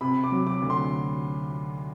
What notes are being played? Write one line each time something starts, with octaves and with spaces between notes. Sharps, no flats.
C3 B5
D6
F#3
D6
D2
C6